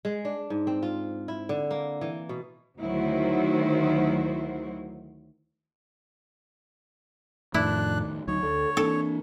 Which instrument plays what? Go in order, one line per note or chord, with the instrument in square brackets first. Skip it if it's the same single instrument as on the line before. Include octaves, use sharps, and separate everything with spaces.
[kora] G#3
D4
G#2
C4
F4
E4
D3
A#3
E3
B2
[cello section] D2 D#3 F#3 E4 F#4 C5
[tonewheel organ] F2 A2 F3 [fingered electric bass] D#3 A3 [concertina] D4 F#6 [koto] E4
[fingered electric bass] D2 F#3 [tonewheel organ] D#4 [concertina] C#5
[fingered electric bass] D2 [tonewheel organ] A4
[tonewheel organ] E3 A#3 [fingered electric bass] C4 D4 [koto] A4